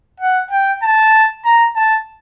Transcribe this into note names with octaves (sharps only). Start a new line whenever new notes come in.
F#5
G5
A5
A#5
A5